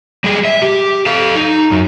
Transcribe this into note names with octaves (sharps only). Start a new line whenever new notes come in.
G3 G#3 G#4
E5
G4
A4 F5
D#4
F#2